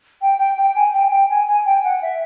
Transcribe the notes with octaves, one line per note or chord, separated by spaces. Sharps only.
G5
G5
G5
G#5
G5
G5
G#5
G#5
G5
F#5
E5